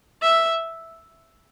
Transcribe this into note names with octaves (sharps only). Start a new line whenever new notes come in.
E5